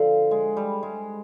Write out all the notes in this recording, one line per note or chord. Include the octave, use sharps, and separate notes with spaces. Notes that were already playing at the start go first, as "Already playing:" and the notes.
Already playing: D3 F3
G#3
G3
G#3